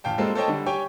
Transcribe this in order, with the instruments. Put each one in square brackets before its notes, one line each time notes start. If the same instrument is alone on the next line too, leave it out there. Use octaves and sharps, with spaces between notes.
[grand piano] A1 F5 G5 A5
G3 G#3 A#3 C4 F4 A4
A4 C5 C#5 D#5 G5 A5
D3 G3
G4 C#5 G5 G#5